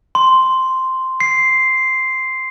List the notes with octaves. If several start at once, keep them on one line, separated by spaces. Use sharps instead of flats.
C6
C7